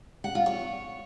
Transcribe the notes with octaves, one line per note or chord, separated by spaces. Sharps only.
F#5
F4
C#5